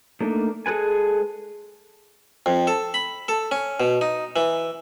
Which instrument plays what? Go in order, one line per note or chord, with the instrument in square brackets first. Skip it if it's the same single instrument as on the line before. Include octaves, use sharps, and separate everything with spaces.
[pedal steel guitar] A3 A#3 D4 D#4
G#3 G#4 A4 B4 G#5
[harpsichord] F2
A4
B5
A4
C#4
B2
D#4
E3